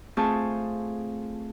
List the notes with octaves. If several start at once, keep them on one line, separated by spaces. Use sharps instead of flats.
A3 C4 F4 G#4 A5 C#6